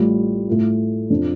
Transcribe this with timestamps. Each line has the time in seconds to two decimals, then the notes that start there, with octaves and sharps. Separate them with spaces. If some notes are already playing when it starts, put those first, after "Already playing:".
Already playing: A1 A2 G3 F4
0.47 A2 A3 F4
1.10 F2 F3 D4